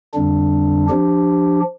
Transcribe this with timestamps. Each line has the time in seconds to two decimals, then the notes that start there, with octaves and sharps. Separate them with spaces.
0.14 F2 D3 G3 D4
0.89 F3 D4 G4